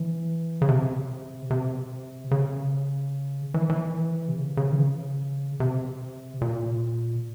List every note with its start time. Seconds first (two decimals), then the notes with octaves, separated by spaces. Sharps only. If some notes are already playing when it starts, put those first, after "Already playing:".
Already playing: E3
0.62 C#3
0.69 C3
1.50 C3
2.31 C#3
3.54 E3
3.70 E3
4.28 C3
4.37 C#3
4.57 C#3
4.72 E3
4.78 C#3
5.60 C3
6.41 A#2